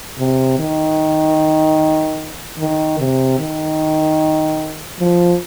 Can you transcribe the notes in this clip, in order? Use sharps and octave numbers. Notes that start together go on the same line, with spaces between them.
C3
D#3
D#3
C3
D#3
F3